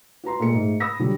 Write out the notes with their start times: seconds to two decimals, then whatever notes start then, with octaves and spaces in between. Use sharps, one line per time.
0.24 F#4 B4 A#5 C6
0.40 A#2 G#3 A4 C#7
0.53 G#2 A3
0.80 B5 D#6 E6 A#6
0.99 D3 F#3 G3